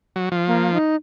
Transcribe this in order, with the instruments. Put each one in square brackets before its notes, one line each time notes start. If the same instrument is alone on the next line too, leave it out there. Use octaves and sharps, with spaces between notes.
[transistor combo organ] F#3
F3
[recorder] A#3
D#4